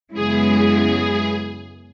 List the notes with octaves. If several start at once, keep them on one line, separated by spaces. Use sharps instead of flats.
F#2 C#3 G#3 B3 E4 G#4